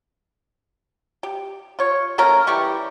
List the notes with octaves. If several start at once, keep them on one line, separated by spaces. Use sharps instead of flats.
G4
F4 C#5
A3 A#3 C#4 A#4
E3 G3 G4 C#6